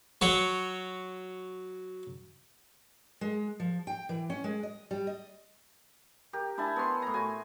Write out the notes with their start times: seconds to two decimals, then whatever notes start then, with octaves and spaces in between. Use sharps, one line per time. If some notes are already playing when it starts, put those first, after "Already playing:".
0.21 F#3 C#5
3.21 G#3
3.60 F3
3.87 G5
4.09 E3
4.30 C#4
4.44 G#3
4.63 D#5
4.91 G3
5.07 D#5
6.33 G4 A#4
6.58 D4 E4 G#5 A5
6.76 B3 C#5 C6
7.02 A2 A#5
7.14 F#4 G#5